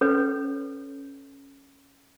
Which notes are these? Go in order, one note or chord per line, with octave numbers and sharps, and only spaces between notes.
C#4 A4 B4 C#5